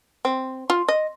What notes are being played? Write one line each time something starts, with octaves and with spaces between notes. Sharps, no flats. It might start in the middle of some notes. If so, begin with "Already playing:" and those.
C4
F4
D#5